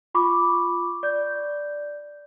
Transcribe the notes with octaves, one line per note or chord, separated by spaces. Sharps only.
F4 B5 C#6 D6
D5 G6